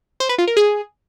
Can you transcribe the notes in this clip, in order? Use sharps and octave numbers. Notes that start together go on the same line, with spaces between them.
C5
B4
F4
A#4
G#4